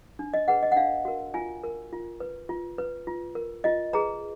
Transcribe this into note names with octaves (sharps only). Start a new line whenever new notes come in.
D4
D#5
G#4 B4 F#5
D#5
F#5
D4 F5
F#4 A#4
F4 G#5
A#4
F4
B4
F4
B4
F4
A#4
F4 D#5
G#4 B4 A#5